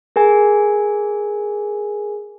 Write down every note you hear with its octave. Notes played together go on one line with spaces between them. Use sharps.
G#4 A#4 G#5